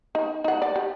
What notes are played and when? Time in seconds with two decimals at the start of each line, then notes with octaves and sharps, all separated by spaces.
0.15 D#4
0.44 D#4 F#5
0.62 D5
0.76 G4